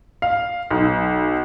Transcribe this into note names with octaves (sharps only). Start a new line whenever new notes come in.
F5
B1